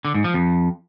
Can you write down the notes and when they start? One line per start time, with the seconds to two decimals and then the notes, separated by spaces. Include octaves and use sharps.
0.05 D3
0.14 G#2
0.24 F3
0.34 F2